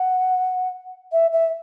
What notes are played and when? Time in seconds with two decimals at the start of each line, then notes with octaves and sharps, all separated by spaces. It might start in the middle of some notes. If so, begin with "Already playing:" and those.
Already playing: F#5
1.12 E5
1.32 E5